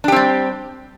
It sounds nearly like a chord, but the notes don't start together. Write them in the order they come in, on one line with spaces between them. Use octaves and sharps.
D4 G4 C4 G3